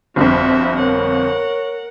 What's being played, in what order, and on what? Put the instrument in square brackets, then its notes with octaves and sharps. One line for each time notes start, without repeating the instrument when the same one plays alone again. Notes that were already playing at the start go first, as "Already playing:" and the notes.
[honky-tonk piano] G1 F2 [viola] F#4 E5
[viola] A#4 F#5 [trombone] C#5